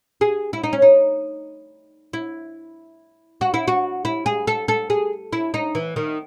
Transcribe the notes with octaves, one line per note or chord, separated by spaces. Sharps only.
G#4
E4
D#4
C#4
D#4
E4
F#4
E4
F#4
E4
G#4
A4
A4
G#4
E4
D#4
E3
D#3